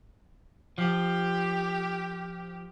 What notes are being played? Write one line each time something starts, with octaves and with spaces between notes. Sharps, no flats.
F3 G4